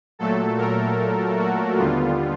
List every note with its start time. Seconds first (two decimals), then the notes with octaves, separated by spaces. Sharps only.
0.19 A#2 F#3 A3 A4
0.58 A#4
1.38 F#4
1.77 D#2 D3 G3 B3 F4